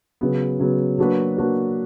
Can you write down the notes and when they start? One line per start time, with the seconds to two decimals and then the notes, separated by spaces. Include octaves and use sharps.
0.21 C#3 F#3 B3
0.60 C#3 F#3 B3
0.98 F#3 A#3 D4 F#4 B4
1.37 F#3 A#3 D4 F#4 B4